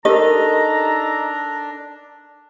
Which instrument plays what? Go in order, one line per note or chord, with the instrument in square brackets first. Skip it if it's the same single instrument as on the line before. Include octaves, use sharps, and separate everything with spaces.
[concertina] D4 [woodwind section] D#4 A4 A#5 [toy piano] G4 A#4 [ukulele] D#5